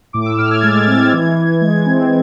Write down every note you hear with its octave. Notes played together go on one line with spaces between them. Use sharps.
A2 D6
E6
A2 F6
G#6
G#3 A6
G#6
A6
C4 G#6
A6
E3 G#6
E3
G#3 G#6
C4